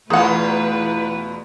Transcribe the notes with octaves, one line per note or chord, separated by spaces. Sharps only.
E2 B2 A3 F4 G#4 B4 F#5